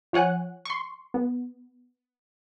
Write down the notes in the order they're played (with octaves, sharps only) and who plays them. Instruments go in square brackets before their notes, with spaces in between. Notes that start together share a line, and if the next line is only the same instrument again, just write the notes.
[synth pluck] F3 C#5 F#5 G#5 F#6
C6 C#6
B3